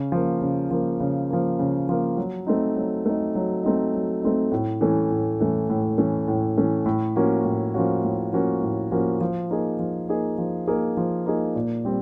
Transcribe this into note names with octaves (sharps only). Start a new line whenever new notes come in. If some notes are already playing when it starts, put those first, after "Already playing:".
Already playing: C#3
F3 A#3
C#3
F3 A#3
C#3
F3 A#3
C#3
F3 A#3
F#3
A3 C4 D#4
F#3
A3 C4 D#4
F#3
A3 C4 D#4
F#3
A3 C4 D#4
A2
E3 A3 C#4
A2
E3 A3 C#4
A2
E3 A3 C#4
A2
E3 A3 C#4
A2
F3 A#3 C#4 F#4
A2
F3 A#3 C#4 F#4
A2
F3 A#3 C#4 F#4
A2
F3 A#3 C#4 F#4
F3
A#3 D#4 G#4
F3
A#3 D#4 G#4
F3
A#3 D#4 G#4
F3
A#3 D#4 G#4
A#2
G3 C4